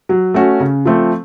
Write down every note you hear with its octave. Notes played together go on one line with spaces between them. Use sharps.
F#3
A3 C#4 F#4
C#3
F3 A3 C4